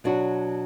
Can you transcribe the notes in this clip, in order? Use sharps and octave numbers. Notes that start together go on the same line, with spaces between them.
B2 F#3 D4 F#4